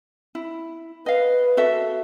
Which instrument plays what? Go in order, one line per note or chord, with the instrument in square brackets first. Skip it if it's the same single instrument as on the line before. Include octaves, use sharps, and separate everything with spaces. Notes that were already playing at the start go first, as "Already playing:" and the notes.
[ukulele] E4
[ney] B4 [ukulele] D#5 F5
[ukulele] F#4 A4 E5